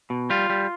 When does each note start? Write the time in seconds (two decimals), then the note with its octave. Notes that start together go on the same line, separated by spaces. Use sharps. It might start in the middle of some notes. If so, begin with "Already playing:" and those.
0.10 B2
0.30 G3 F4
0.50 G3